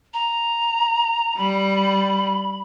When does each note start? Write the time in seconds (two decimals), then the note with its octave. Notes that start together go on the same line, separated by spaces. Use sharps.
0.14 A#5
1.38 G3 B5